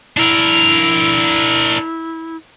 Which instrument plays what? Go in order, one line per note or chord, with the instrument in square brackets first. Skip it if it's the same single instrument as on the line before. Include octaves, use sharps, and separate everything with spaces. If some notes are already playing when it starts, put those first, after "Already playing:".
[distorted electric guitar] D4 A#4 [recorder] E4